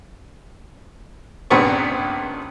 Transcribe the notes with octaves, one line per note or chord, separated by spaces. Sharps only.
C#2 G2 A#2 B3 C4 C#6